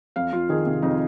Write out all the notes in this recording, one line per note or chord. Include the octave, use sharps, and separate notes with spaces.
F2 F5
F2 F4
D#3 G#4
C3
F2 D#4